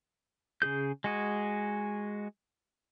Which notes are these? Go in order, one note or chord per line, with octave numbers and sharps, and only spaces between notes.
C#3 G4 G#4 G6
G#3 F#4 G#4